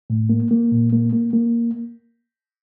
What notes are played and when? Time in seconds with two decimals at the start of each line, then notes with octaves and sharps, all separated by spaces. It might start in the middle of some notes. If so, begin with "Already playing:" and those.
0.10 A2
0.29 A#3
0.51 A#3
0.72 A#2
0.92 A#3
1.13 A#3
1.33 A#3